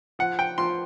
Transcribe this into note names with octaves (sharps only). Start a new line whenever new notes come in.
F3 F#5
G5
F3 C6